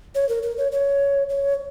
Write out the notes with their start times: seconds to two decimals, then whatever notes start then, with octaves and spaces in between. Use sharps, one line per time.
0.15 C#5
0.29 A#4
0.43 A#4
0.57 C#5
0.72 C#5
1.29 C#5